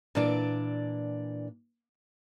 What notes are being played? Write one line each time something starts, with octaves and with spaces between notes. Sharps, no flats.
A#2 E3 D4 D5